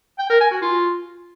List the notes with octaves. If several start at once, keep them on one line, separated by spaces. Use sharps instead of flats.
G5
A#4
G#5
F#4
F4